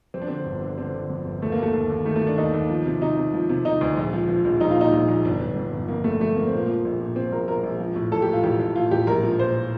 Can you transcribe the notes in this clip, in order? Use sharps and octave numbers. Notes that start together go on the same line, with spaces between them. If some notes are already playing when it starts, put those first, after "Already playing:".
F2 C4
D4
D3 C4
G1
D3
D3 C4
D3
F2
G1
D#2 A3
A#3
D#2 A3
D#2
D#2
D#3 A3
A3
D#3
D4
D#2 D#4
D#2
F3
C3
C3 D#4
C3
F3
C3
C3 D#4
D2
A#1
F3
F3
A#1
A#1 D#4
F4
A#2 D#4
A#1
A#1
G1 D4
G1
F2
G1
F2 A#3
F2 A3
F2 A3
F2 A#3
C4
A#2 A#3
F3
A#1
A#2
A#2 C4
A#1 A#4
A#1 A#4
A#1
F3
A2
A1 A4
G4
A2
F4
A1 G4
A1
A2 F4
A1 G4
A#1 A#4
F3
A#2 C5